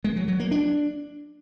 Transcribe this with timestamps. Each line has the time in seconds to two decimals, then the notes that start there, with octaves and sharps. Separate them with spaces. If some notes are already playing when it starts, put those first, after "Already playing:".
0.04 G#3
0.16 F#3
0.28 F#3
0.40 A#3
0.51 D4